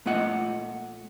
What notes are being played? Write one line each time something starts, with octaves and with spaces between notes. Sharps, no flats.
A#2 A3 F4 D#5 F#5